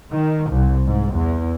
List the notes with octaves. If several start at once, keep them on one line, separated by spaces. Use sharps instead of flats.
D#3
C2
G#2
E2